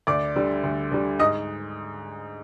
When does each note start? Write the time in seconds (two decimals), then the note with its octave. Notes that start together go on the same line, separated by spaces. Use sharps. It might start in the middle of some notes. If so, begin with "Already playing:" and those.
0.07 D2 D5 D6
0.36 D3 G3
0.64 D2
0.92 D3 G3
1.19 G#2 D#5 D#6